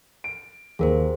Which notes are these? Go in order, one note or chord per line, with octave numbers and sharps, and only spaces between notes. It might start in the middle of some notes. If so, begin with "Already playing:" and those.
D7
D#2 G#4 A#4 C5